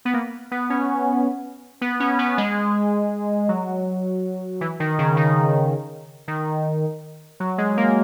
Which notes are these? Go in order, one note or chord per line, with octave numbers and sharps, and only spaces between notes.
B3
A#3
B3
C#4
B3
C#4
B3
G#3
F#3
E3
D#3
C#3
D#3
D#3
F#3
G#3
A#3